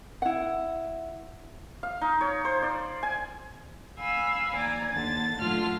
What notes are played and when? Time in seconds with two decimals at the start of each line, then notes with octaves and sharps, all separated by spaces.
0.22 E4 F#5
1.83 F5
2.01 D#4
2.21 C#5
2.45 C5
2.63 D5
3.03 G#5
3.99 F5 G#5 B5 E6
4.55 D#2 D5 G#5 A#5
4.92 D#2 D3 A6
5.38 A2 D3 F#3 F4 F6